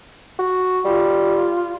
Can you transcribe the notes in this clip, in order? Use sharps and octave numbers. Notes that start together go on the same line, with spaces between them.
F#4
G3 F4